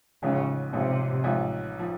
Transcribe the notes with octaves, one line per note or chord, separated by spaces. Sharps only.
A1 G#2 C#3 F3
A1 G#2 C3 F3
A1 G#2 F3
F3